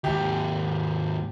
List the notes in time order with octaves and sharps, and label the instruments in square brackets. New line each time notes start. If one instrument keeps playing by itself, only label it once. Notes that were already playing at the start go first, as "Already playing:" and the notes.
[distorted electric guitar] D#2 G#2 [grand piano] G4